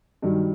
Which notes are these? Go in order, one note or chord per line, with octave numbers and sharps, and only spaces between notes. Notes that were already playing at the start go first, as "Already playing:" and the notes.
G2 D#3 F#3